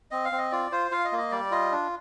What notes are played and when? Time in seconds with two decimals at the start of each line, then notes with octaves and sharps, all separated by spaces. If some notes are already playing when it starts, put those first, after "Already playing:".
0.11 C4 D#5
0.25 F5
0.32 C4
0.38 D#5
0.52 F4 D5
0.72 F4 C5
0.91 F4 F5
1.05 D#5
1.12 A#3
1.18 D#5
1.31 G3 D5
1.51 F4 D#5
1.72 D4